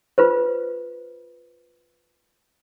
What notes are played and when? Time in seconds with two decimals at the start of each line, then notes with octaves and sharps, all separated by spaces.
0.18 F4 B4 C5